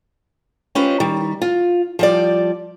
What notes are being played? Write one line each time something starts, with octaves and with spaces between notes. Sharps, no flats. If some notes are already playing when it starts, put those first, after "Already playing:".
C#4 D#4 F4 G4 B4 C5
D#3 G3
F4
F3 G3 D5